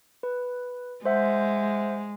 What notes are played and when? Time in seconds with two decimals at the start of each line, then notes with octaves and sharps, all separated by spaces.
0.23 B4
1.05 G#3 C5 E5 F#5